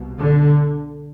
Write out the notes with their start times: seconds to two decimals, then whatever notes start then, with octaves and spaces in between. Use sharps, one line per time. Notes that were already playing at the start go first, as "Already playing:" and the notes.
Already playing: C2 B2
0.18 D3